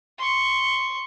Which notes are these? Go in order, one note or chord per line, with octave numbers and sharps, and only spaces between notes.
C6 C#6